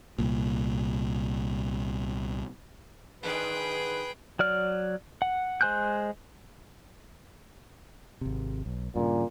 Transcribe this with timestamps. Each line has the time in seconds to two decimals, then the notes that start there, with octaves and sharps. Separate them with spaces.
0.18 C2 A#2
3.23 G#2 D#3 D4 G#4 B4 G5
4.39 F#3 D5 F6
5.22 F#5
5.61 G#3 C5 G#5 F#6 G6
8.21 G#1 C3
8.66 B1
8.95 G2 A#2 C#3